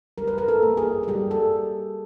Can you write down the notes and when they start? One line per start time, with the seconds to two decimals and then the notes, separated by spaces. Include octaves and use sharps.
0.18 G3 A#4
0.28 B4
0.38 A#4
0.48 A4
0.62 A#3
0.77 G#4
1.03 G#4
1.08 G3 G4
1.31 A4